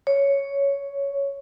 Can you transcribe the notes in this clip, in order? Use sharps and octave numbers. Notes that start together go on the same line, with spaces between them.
C#5